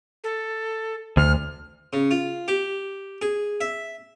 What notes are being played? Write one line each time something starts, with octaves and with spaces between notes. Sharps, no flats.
A4
D2 F6
C#3
F4
G4
G#4
E5